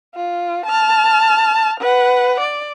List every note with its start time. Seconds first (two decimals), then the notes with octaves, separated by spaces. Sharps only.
0.15 F4
0.66 A5 F6
1.80 B4 F#5
2.40 D5